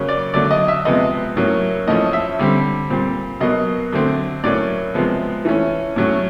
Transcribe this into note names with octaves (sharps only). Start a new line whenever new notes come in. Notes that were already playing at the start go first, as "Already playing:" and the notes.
Already playing: C#3 F#3 A#3 C#4
D5
D3 F#3 A3 D5
D#5
E5
C3 F3 G#3 B3 D#5
A2 F#3 A#3 C#4
A2 F3 A3 C#4 D#5
E5
D3 G3 C4
A#2 G3 C4
B2 F#3 A#3 D#5
D3 F#3 A3 C4
A2 F#3 A#3 C#4 D5
C3 F3 G#3 B3
E3 A3 C#4
A2 F#3 A3 C#4